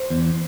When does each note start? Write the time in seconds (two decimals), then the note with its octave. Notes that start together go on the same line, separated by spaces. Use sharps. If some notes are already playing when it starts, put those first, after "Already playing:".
Already playing: C5
0.10 E2